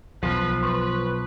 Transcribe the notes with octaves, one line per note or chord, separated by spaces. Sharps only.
B1 F3 B4
B4 C6 C#6